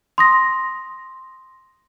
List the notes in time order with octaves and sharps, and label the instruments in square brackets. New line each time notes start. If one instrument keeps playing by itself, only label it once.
[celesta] C6 D#6 A#6